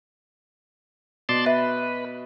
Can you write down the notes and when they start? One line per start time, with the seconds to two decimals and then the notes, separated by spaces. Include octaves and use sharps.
1.29 B2 D5 A5 C6
1.46 B4 E5